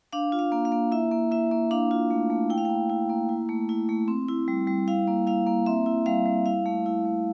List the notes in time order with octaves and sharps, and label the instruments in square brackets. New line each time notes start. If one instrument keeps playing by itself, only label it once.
[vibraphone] D4 F5
F4
F5
A#3
F5
A#3
E4 E5
A#3
E4 E5
A#3
D4 F5
F4
A3
A3
E4 G5
F5
A#3 G5
E4
A#3
E4
A3
E4
A3
C4
E4
G3
G3
E4 F5
A#3
E4 F5
A#3
C4 E5
E4
G3 F5
G3
E4 F5
A3
E4
A3